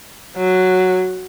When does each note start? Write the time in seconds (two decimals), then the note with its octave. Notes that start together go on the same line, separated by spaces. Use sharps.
0.37 F#3